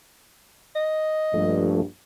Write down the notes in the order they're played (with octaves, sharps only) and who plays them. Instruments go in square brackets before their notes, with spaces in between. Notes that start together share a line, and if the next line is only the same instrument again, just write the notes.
[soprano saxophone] D#5
[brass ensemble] A#1 G2 [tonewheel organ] F3 A3